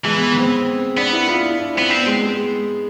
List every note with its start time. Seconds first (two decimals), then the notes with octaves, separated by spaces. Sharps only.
0.04 E3 G#3
0.17 B3
0.28 B3
0.39 C4
0.97 B3 D4
1.13 E4
1.29 F4
1.44 E4
1.60 D4
1.75 B3 C4
1.91 B3 C4
2.06 G#3
2.22 G#3